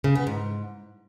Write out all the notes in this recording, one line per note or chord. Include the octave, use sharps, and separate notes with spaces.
C#3
B3
G#2